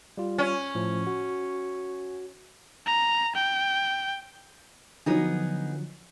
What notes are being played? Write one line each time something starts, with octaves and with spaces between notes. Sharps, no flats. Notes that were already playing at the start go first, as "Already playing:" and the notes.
G3 F4
C#4
A2 F3
F#4
A#5
G5
D3 F3 F#3 B3 D#4 G#4